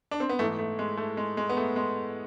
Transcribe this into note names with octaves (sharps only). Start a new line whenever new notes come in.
D4
C4
B3
G#2 E3 A3
A3
G#3
A3
G#3
G#3
B3
A3
G#3